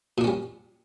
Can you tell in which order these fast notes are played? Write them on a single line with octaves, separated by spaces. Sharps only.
A#2 D4 C#4 G3